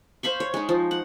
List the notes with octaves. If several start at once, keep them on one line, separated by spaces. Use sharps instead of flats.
C5 F5 B5 C#6
C#5
G#3 D#4
F3
F#5